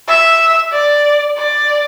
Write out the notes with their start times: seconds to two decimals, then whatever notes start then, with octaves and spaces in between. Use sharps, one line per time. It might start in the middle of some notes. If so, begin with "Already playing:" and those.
0.08 E5
0.72 D5
1.37 D5